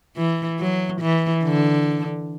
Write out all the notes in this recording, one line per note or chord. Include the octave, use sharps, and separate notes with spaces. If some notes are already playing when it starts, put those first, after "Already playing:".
E3
F#3
E3
D3